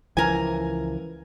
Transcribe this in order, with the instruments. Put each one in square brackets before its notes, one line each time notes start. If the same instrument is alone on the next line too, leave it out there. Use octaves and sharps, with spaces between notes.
[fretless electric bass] C#2 E3 F3 [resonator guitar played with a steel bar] A#4 G#5